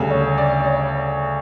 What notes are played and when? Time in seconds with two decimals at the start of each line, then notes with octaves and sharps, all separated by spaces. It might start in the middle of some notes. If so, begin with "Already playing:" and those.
Already playing: D2 C#3 G3 A4
0.10 C#5
0.38 D5
0.60 D5
0.65 C#5